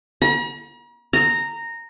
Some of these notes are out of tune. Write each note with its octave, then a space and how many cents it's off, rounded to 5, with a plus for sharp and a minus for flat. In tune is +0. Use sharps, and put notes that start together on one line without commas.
A#5 +45
A#5 -10